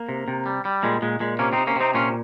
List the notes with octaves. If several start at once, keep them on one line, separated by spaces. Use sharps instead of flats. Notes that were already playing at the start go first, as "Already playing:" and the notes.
Already playing: A#3
C3
C3
G3
G3
A#2 G#3
A#2 G#3
A#2 G#3
C3 A#3 C#4
C3 C4 D#4
A#3 C#4
C3 C4 D#4
A#2 C#4 F4